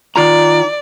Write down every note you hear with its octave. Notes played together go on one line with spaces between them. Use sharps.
D#3 F4 D5 A#5